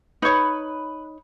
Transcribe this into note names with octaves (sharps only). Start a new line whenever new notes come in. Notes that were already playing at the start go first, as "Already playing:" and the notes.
D#4 B4 C#5